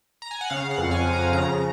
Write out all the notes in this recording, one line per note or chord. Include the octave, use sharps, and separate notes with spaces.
A#5
G#5
F#5
C#3 F5
F#5
F2
G#5
F3
A#5
C#3 A#5